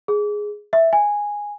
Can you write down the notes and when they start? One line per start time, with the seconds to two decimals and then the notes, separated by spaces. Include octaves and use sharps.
0.08 G#4
0.73 E5
0.93 G#5